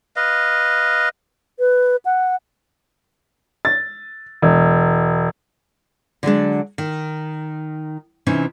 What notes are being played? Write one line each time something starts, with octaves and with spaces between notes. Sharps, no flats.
B4 D#5 F5
B4
F#5
A6
E1
D3 F#3 G#3 D4
D#3
C3 E3 C#4 D#4